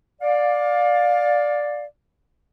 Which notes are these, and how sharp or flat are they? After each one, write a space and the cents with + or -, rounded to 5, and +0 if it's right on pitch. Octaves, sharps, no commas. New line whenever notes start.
D5 +0 F5 +25